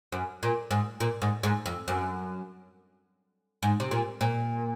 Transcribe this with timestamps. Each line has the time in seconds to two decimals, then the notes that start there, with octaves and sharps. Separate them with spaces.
0.12 F#2
0.43 A#2
0.71 G#2
1.00 A#2
1.22 G#2
1.43 G#2
1.66 F2
1.88 F#2
3.63 G#2
3.80 C3
3.91 A#2
4.21 A#2